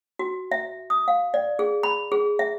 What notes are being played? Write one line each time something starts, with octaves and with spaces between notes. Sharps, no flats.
F#4
E5
D#6
F5
D5
G#4
B5
G#4
E5